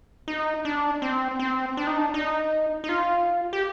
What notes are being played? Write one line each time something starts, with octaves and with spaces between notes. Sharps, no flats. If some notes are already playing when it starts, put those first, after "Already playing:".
D#4
D4
C4
C4
D4
D#4
D4
D#4
D#4
F4
G4